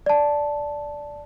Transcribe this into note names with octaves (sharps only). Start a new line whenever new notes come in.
D5 A5